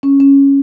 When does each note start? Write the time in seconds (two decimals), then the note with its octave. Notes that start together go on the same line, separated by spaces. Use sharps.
0.03 C#4
0.20 C#4